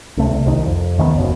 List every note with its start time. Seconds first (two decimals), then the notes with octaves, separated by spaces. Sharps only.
0.17 C#2 C3 A3
0.32 C2
0.46 C2 D#3
0.66 F2
0.98 D#2 D#3 G#3 B3
1.16 F#1 D#2 B2